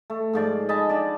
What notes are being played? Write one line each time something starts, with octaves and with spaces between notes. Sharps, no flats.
A3
G#2 F3 D5
D#5 G#5 A5 B5
D4 D5